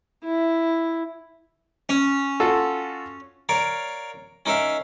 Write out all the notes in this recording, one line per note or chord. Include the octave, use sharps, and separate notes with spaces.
E4
C#4
F4 F#4 A4
A#4 C#5 D5 F5 A#5
C#4 D#4 A#4 E5 F5